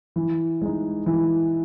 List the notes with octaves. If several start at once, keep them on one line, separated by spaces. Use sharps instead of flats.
E3
G#3 D#4
E3